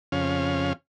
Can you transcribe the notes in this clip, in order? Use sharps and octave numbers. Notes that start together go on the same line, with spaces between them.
F2 C#3 C#4 F5